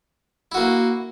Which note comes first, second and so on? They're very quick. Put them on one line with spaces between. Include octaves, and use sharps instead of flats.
E4 F#4 A#3